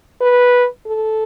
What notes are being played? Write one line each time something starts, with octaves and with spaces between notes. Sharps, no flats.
B4
A4